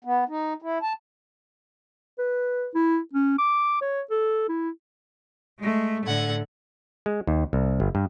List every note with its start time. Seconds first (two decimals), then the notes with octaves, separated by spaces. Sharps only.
0.04 B3
0.29 D#4
0.62 E4
0.82 A5
2.19 B4
2.75 E4
3.13 C#4
3.38 D6
3.82 C#5
4.11 A4
4.49 E4
5.58 G#3 A3
6.05 A2 D3 A4 F#5 G#6
7.06 G#3
7.27 D#2
7.53 C2
7.80 G1
7.95 G2